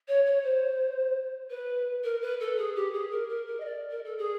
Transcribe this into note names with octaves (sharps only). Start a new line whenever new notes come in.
C#5
C#5
C5
B4
A#4
B4
A4
G#4
G4
G#4
A#4
A#4
A#4
D#5
D5
A#4
A4
G#4